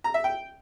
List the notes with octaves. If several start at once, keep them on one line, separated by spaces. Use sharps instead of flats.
A#5
E5
G5